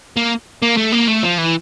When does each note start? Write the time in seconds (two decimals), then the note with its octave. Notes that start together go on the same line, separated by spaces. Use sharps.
0.17 A#3
0.63 A#3
0.77 A3
0.92 A#3
1.08 A3
1.23 F3
1.38 E3